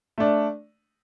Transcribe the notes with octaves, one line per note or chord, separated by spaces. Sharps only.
A3 D4